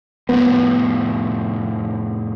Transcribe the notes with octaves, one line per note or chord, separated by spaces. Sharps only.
F2 A2 B3